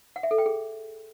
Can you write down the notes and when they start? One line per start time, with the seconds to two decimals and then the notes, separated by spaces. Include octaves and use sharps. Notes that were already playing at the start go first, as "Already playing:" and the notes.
0.16 F#5
0.23 E5
0.31 A4
0.38 G5
0.46 G#4